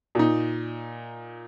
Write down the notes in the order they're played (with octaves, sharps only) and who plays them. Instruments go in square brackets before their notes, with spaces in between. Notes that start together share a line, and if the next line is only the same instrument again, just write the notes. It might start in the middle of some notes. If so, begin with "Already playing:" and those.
[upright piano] A#2 D#4